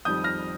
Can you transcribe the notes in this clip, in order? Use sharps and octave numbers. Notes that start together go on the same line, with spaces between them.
F2 D#3 G3 D#6 G6
F6 A#6